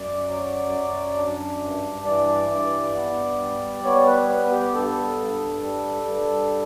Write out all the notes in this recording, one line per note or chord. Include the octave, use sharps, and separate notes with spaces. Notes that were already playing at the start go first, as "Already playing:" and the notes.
Already playing: F#2 D5
F#3
F#2
D4
G2
E3 D5
G2
B3
G3
B3 C#5
B4
B3 B4
G4
G2 A4
G2
G3
G2